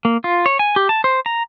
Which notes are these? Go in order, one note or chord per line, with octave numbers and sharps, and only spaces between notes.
A#3
F4
C#5
G#5
G4
A5
C5
A#5